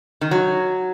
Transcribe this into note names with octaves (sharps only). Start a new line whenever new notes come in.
D#3
F#3